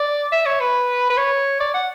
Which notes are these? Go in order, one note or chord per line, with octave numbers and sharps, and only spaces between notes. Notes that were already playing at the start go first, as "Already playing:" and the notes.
Already playing: D5
E5
C#5
B4
B4
C#5
D5
F#5